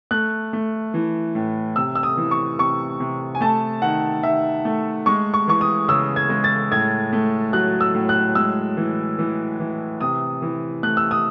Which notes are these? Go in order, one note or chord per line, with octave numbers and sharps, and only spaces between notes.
A3 F#6
A3
E3
A2
C3 E6
E6
D#6
E3
C#6
C3 C#6
C3
G#5
A3 A5
D#3 F#5
D#3 E5
A3
G#3 C#6
C#6
E3 C#6
D#6
C#3 E6
G#6
G#3
A6
A2 G#6
A3
F#3 F#6
E6
A2
F#6
G#3 E6
E3
E3
E3
C3 D#6
E3
A3 F#6
E6
D#6